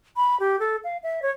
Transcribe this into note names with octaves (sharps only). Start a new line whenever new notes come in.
B5
G4
A4
F5
E5
C#5